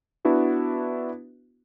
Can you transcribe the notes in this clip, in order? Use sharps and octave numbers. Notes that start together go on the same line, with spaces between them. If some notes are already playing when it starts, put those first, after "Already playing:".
B3 D4 E4 F#4 B4